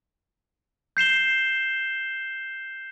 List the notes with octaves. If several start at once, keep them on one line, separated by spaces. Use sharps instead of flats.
G6 C7 E7 G7